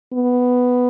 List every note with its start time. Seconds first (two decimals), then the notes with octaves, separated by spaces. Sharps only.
0.13 B3